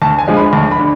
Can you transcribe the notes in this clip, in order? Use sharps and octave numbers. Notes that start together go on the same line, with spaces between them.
D2 A5
G#5
D3 F3 G#3
B5
D2 A5
B5
D3